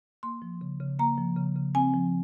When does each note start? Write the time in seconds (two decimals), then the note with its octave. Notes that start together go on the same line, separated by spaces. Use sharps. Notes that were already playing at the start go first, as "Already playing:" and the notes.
0.23 A#3 C6
0.42 F3
0.61 C#3
0.80 C#3
0.99 A#3 A#5
1.18 F3
1.37 C#3
1.56 C#3
1.75 C4 G#5
1.94 F3